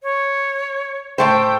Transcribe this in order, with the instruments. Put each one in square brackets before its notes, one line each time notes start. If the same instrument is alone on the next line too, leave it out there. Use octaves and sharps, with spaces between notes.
[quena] C#5
[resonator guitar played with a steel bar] A2 A3 C5 [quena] G5